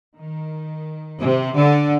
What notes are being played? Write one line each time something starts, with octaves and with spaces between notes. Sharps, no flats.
D#3
C3
D3